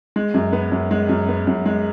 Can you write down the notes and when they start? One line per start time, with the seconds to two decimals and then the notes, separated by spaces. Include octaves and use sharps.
0.16 G#3
0.34 F#2
0.53 B3
0.72 F#2
0.91 G#3
1.09 F#2
1.28 B3
1.47 F#2
1.66 G#3